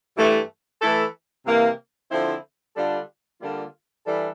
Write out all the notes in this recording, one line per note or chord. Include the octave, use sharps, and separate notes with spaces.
G2 E3 A3
E3 A3 E4 A4
C3 E3 A#3
D3 F3 C4 E4
D3 G3 D4 F4 A4
D3 G3 A#3 F4
E3 G3 D4 A4